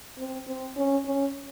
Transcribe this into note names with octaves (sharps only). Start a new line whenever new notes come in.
C4
C4
C#4
C#4